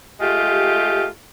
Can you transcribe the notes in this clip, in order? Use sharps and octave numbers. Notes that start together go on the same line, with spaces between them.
G#3 A3 F4 G4